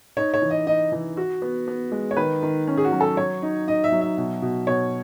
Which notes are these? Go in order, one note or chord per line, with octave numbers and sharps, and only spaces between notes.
D#4 C#5
C#5
E3
D#5
D#4 D#5
E3
F#4
B3
B3
G#3
C#5
D#3 B4
D#3
C#4
G#4
F#4
F#3
A4
F#3 C#5
D#4
D#4 D#5
E5
F#3
E5
B2
B2
B2 C#5